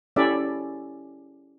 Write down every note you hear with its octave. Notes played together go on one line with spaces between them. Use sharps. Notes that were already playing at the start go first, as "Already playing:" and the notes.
C#4 E4 G4 A4 D5 E5